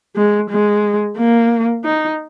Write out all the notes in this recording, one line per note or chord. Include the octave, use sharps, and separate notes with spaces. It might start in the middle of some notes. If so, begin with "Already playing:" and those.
G#3
G#3
A#3
D#4